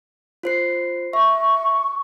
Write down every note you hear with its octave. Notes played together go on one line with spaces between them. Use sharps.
F4 C5 C7
E5 C#6